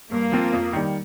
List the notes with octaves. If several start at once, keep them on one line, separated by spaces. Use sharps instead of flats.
G2 A#3
F3 C4 F4
F2
D#3 G3